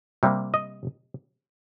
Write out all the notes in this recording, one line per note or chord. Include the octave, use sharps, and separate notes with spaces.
C3 G3 A#3
D#5